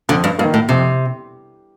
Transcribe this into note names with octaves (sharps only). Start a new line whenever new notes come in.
F2 D3
G2
G2 D#3 A#3
A2
F2 C3